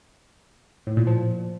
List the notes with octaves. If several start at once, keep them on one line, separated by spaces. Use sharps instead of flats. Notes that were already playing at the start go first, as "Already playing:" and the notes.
A2
A#2
F3